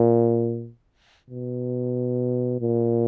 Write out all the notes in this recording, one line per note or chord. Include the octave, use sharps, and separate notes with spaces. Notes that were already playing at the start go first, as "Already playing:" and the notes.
Already playing: A#2
B2
A#2